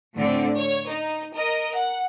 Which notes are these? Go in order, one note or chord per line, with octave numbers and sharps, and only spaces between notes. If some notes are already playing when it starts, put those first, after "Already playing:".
A2 D3 C4
C#5
D#4
A#4 D#5
F#5